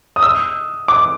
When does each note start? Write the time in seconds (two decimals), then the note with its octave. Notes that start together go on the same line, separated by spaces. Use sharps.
0.16 D#6
0.23 E6
0.88 D6